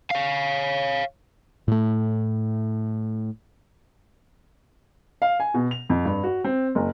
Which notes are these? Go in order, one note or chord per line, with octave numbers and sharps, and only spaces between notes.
C#5 F5
A2 A3
F5
G#5
B2
F7
F2
G2
F#4
C4
F#1